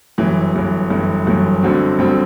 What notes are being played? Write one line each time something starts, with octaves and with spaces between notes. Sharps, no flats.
G1 F#2 E3
G1 F#2 E3
G1 F#2 E3
G1 F#2 E3
G1 G2 D3 F#3 C4
G1 G2 D3 F#3 C4